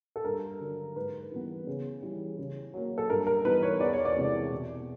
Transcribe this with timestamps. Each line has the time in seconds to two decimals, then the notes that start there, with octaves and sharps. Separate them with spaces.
0.16 A4
0.24 G2 A#4
0.61 D3 F#3
0.96 G#2 B4
1.32 E3 G3 B3
1.67 C#3
2.03 E3 G3
2.38 C#3
2.74 F#3 A#3
2.98 A4
3.10 G2 A#4
3.27 A#4
3.45 E3 G3 B3 D#4 B4
3.63 C#5
3.80 E2 D5
3.93 C#5
4.05 D5
4.16 C3 E3 G#3
4.52 B2